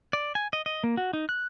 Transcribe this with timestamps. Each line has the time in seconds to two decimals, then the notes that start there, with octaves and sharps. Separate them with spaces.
0.13 D5
0.35 G#5
0.53 D#5
0.66 D#5
0.84 A#3
0.97 F#4
1.13 D#4
1.29 F#6